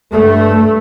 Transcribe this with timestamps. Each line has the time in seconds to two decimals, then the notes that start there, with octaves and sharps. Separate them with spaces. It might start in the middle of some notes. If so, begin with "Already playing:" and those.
0.13 G2 A3